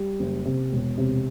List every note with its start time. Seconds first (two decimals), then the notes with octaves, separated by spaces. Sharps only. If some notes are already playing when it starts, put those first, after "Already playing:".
Already playing: G3
0.20 F#1
0.45 C3
0.72 E1
0.98 C3